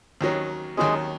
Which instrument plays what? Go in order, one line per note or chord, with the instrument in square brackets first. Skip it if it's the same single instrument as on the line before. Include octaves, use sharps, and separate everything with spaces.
[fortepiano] D#2 D#3 F#3 C#4
[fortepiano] D#2 D#3 F#3 C#4 [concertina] G#3 G#4